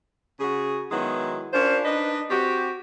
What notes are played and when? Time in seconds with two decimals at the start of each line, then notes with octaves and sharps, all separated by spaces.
0.40 C#3 F#4 G#4
0.91 D#3 F#3 G#3 B3 E4
1.53 C#4 D4 F4 A#4 C5
1.85 D4 D#4 B4 D#5
2.29 C4 F#4 G4